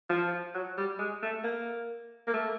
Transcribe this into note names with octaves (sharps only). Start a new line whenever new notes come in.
F3
F#3
G3
G#3
A3
A#3
A#3
A3